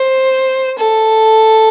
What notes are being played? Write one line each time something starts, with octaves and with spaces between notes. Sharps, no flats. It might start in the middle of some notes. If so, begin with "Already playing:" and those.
Already playing: C5
A4